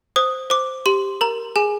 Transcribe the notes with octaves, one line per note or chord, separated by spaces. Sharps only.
C5 D#6
C5 D6
G4 C6
A#4 A#5
G#4 G#5